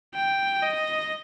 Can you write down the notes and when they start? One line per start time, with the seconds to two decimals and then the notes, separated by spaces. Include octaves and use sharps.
0.15 G5
0.63 D#5